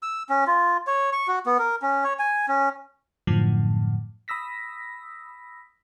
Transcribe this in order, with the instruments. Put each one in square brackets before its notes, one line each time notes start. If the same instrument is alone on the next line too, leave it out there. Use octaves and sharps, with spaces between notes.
[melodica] E6
C#4
F4
C#5
C#6
F#4
B3
A#4
C#4
C#5
G#5
C#4
[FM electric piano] F#2 A2 D3 F3
B5 D#6 E6 A#6 B6